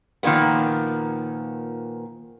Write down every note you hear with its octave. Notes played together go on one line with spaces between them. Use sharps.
A#2 D#3 F3 A#3 B3